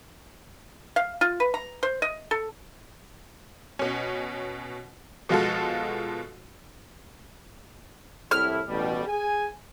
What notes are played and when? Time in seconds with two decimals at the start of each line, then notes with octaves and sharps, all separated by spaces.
0.96 F5
1.21 F4
1.40 B4
1.54 A#5
1.83 C5
2.02 D#5
2.31 A4
3.79 B2 C#4
5.29 B2 F3 G#3 F4 F#4 A4
8.31 C2 A2 E4 F6
8.67 A1 B2 G3
9.06 G#4 G#5